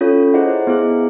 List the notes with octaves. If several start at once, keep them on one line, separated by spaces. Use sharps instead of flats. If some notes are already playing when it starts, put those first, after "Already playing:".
C#4 F4 A4 C#5
E4 G#4 C5 D#5 F#5
B3 E4 G#4